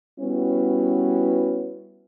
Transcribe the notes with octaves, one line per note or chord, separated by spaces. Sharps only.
G3 B3 C#4 E4 F#4 B4